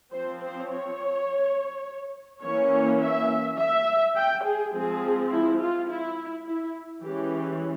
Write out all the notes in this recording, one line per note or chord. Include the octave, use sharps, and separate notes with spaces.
F3 C4 C5
C5
C#5
E3 A#3 C#4 C#5
E5
E5
G5
G#4
F3 G#3 C4 G#4
E4
F4
E4
E4
E3 G#3 C#4 G4